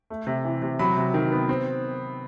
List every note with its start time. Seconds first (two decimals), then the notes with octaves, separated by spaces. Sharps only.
0.10 A3
0.27 C3
0.45 E3
0.62 C3
0.79 F#3 B5
0.97 C3
1.14 D#3
1.32 B3
1.49 C4